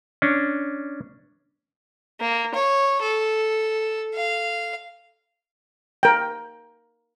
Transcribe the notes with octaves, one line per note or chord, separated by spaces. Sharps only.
C#4 D4
A#3
C#5
A4
F5
A#4 G5